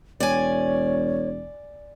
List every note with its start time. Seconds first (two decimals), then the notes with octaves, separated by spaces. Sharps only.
0.20 E1 C#5 D5 G#5